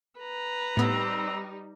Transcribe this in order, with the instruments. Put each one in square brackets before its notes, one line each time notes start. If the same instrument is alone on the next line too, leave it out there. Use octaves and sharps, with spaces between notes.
[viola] B4 A#5
[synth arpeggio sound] A2 B3 [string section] G3 D#4 [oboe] C4